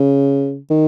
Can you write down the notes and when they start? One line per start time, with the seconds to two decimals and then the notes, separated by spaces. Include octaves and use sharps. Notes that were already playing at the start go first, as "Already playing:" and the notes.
Already playing: C#3
0.70 D#3